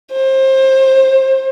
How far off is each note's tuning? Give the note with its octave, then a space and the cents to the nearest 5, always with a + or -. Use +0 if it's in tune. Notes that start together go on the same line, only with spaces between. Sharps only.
C5 +25